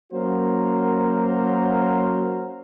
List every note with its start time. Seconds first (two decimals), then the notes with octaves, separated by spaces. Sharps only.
0.13 F#3 A#3 C#4 F#4 A#4 C5